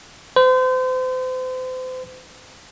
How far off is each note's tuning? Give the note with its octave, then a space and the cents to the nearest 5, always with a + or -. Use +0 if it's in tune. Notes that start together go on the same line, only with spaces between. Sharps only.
C5 -35